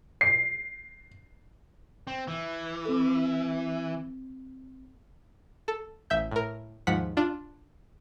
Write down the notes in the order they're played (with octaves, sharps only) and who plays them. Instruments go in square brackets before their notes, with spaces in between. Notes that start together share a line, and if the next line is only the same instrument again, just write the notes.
[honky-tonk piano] C7
[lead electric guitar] C4
E3
[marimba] C4 A4
[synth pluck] A4
A1 E5 G6
A2 A#4
D#2 G#2 F3 F#5 B6
D4 F4